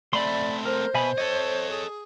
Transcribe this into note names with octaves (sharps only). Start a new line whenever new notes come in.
A3 C4 D5 E5 B5 C6
A#4 C5
B2 E5 G#5 B5
A4 C#5 D#5
G#4